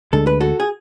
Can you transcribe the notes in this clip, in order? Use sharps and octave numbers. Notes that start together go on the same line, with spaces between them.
D2 D3 G#3 A4
B4
F#4 A4
G#4